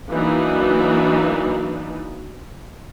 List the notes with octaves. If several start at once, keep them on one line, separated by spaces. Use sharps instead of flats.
E3 F#3 A#3 D4 D#4